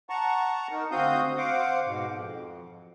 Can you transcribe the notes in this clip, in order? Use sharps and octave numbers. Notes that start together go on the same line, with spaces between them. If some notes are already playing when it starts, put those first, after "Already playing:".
F#5 A5 A#5 C#6
D#4 A#4
D2 C4 F#4 F5 D#6 G6
C5 F5 F#5 D6
G#2 B2
F2